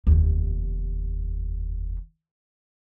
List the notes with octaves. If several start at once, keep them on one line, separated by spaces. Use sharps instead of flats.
F1 D#2